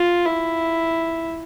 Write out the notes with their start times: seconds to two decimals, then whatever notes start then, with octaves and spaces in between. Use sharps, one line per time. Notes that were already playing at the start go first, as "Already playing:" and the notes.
Already playing: F4
0.26 E4